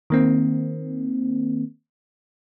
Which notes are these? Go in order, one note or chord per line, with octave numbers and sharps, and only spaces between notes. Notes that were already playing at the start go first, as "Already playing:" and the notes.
D#3 A#3 C4